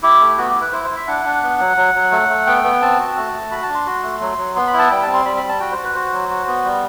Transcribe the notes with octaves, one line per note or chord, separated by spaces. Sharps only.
E4 G4
A3
B3 F#4
G4
E4
B4
E4 C5
C5
E4
E5
D4 F#5
D4
B3
F#3
F#3
F#3
A3
A3
B3 G5
B3
C4 A5
F#4
A3
A3
F#4 B5
A5
D4
C6
F#4
A3
F#3
F#3
B3 C6
B5
E4
A5
G3 G5
A5
C4
C6
G3 B5
B5
G3
A5
F#4 G5
C5
F#4
B4
F#4 C5
F#3
F#4
B3
G3